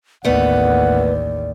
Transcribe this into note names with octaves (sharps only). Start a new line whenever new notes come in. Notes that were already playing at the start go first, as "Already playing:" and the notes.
A1 D#2 A3 B3 D5 F#5